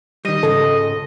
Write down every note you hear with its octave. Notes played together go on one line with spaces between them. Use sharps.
D#3 G3 D#5
C#2 G#2 C#3 A4